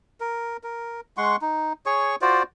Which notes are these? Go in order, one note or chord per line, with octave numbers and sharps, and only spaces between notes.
A#4
A#4
G#3 F#5 C6 C#6
D#4
G#4 C#5 C#6
F4 F#4 C5 D5